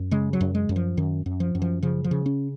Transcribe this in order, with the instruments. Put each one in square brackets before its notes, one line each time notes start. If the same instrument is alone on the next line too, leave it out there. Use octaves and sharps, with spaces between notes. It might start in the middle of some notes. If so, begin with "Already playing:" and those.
Already playing: [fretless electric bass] F#2
C#3 G#3
F#3
F#2
G#3
F#2
F3
F#2 D#3
F#2
F3
F#2
F3
C#3 F3
F3
C#3
C#4